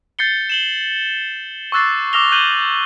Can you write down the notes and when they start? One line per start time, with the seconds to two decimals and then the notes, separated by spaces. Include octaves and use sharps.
0.19 G6 A6 C7 C#7 G7
0.50 E7 F#7 G7
1.72 C#6 D6 E6 F#6 A6 C7
2.13 D6 E6 F6 A#6 F7 G7
2.32 F#6 G6 D#7 F#7 G7